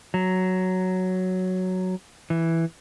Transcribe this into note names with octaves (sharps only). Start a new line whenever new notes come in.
F#3
E3